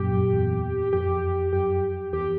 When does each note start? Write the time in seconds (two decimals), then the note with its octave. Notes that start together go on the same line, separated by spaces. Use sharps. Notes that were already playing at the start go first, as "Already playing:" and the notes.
Already playing: F#2 A#2 G4
0.13 F#2
0.33 E2
0.93 F2 G4
1.53 F#2 G4
2.13 E2 G4